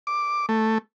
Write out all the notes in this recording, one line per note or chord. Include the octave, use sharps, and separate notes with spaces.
D6
A3